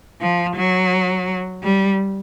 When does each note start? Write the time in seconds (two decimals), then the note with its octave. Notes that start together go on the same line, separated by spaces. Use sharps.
0.21 F3
0.56 F#3
1.63 G3